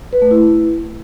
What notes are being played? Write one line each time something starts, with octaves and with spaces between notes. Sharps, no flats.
B4
A3
E4